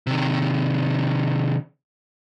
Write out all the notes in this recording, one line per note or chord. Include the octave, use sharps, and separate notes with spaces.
C3 D#3